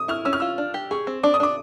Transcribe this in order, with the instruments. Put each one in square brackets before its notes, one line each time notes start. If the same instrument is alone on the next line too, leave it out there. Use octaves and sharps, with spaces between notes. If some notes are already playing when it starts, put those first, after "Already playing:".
Already playing: [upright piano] D#6
[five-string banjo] E4 [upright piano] F6
[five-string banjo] C#4 [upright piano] E6
[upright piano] F6
[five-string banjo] F4 [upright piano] E6
[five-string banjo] D4
G4
[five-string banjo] G#4 [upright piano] C#6
[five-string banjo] C4
[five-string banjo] D4 [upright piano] D6
[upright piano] D#6
[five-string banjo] D4 [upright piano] D6